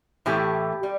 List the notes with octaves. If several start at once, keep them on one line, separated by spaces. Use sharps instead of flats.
A2 E3 A3 G4
G3